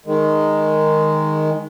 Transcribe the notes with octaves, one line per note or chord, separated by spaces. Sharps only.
D#3 G#3